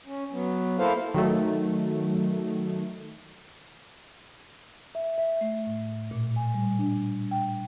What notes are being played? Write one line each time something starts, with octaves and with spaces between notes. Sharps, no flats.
C#4
F#3 B3
A#3 E4 A4 C5 F5
D#3 F#3 A3
E5
E5
A3
A2
A#2
G#5
G3
D4
G5